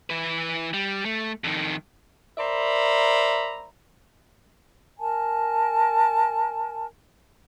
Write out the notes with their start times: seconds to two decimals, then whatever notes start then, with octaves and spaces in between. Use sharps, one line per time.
0.10 E3 B4
0.74 G3
1.05 A3
1.44 F2 D#3
2.38 A#4 C5 D5 E5 A#5 B5
4.99 A#4 G#5 A5